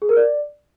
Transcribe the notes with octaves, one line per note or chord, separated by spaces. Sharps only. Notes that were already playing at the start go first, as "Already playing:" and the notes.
G#4
A#4
D5